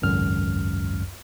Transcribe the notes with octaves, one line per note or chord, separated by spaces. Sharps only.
G#1 C#2 F#2 F6